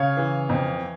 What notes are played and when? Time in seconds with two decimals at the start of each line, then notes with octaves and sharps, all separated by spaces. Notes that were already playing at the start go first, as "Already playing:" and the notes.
Already playing: C#3 C#5 F5
0.17 E3
0.49 F2